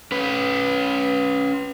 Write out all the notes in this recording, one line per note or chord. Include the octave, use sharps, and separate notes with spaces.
C#4 B4